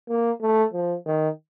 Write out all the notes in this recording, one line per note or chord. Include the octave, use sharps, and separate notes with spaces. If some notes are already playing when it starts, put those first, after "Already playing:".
A#3
A3
F3
D#3